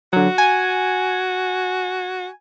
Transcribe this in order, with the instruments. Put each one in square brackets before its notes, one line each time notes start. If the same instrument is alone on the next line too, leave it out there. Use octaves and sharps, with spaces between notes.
[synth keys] D3 F#3 [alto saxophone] F#4
[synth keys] G#5